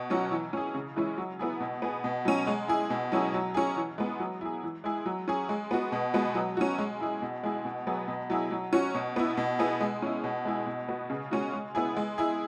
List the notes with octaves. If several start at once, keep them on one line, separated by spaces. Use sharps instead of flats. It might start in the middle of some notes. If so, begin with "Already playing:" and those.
Already playing: B2
F#3 C#4 F#4
E3
C#4 G#4
C#3
E3 G#3 C#4 E4
F#3
B3 E4 G#4
B2
B3 G#4
B2
F#3 C#4
G#3
E4 G#4
B2
F#3 C#4 E4 G#4
F#3
C#4 G#4
E3
G#3 B3
F#3
E4 G#4
E3
G#3 E4 G#4
F#3
C#4 G#4
G#3
B3 F#4
B2
G#3 B3 F#4
F#3
C#4 F#4
G#3
E4 G#4
B2
G#3 E4 G#4
B2
F#3 B3 G#4
B2
F#3 E4 G#4
F#3
C#4 F#4
B2
B3 E4
B2
B3 E4 G#4
G#3
C#4 E4
B2
G#3 E4 G#4
B2
B3 F#4
C#3
G#3 C#4 F#4
G#3
B3 E4 G#4
G#3
E4 G#4